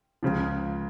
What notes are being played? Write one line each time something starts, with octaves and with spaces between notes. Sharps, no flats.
C#2 C#3 F3